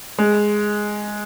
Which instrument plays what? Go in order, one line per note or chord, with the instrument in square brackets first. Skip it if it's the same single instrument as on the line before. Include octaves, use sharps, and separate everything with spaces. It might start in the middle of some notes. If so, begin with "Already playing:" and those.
[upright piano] G#3